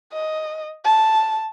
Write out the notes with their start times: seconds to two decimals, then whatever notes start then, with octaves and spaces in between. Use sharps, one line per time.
0.12 D#5
0.85 A5